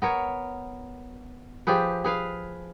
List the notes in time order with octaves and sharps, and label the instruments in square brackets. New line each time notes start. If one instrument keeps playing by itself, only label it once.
[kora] B3 A#4 C#5
F3 G4 G#4 B4
G#4 B4 F5